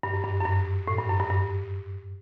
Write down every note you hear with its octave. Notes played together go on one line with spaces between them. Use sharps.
G2
F#2
G2
F#2
G2
A2
G2
F#2
G2
G2